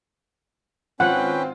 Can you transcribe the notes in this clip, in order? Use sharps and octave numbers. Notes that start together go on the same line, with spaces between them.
G#1 C4 C#4 F4 B4 F#5 G5